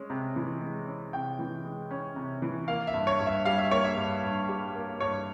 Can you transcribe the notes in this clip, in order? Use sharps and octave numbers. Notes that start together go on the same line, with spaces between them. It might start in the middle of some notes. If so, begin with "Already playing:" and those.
Already playing: G#3 C#4
C3
E3
G#3
C#4
C3 G5
E3
G#3
C#4
C3
E3
A#3 F5
E5
G2
C#5
G2
E5
G3 F5
E5
A#3 C#5
E5
G2
G2
G3
A#3
G2 C#5